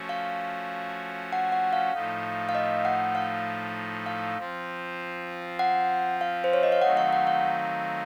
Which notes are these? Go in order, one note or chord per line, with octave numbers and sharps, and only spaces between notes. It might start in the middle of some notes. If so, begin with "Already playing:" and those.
Already playing: F3 A3 C#4 F#4
F5
F#5
F#5
F5
A2 F3 A3 D#4
F5
D#5
F#5
F5
F5
F3 C4 F4
F#5
F5
C5
C#5
D#5
F5
D#3 F#3 A3 C4 D#4 F#5
F5
F#5
F5